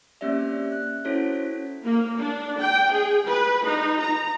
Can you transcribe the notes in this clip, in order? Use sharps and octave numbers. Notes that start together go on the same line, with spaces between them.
A#3 C4 C#4 G4 D5 E5
F#6
C#4 E4 F#4 A4 C5 C#5
A#3
D4
G5
G#4
B4
D#4
A#5